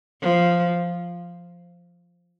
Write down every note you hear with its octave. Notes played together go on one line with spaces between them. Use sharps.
F3